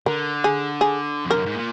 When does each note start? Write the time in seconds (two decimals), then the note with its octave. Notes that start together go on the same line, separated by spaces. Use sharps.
0.06 D3 A#4
0.44 G#4
0.81 G#4
1.26 F2 A#4
1.36 F#2
1.46 G#2
1.55 A#2